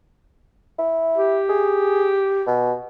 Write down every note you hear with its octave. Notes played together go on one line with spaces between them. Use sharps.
E4
G4
G#4
B2